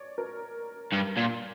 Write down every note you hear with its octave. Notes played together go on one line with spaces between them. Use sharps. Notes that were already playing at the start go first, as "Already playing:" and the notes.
Already playing: C#5 D5
A#4
G2
A#2